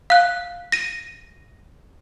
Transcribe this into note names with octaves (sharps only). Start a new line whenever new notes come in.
F5 F#6
A#6 D#7